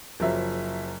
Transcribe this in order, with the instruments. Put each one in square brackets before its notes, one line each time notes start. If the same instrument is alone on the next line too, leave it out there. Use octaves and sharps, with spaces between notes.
[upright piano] F#1 F3 F#3 E5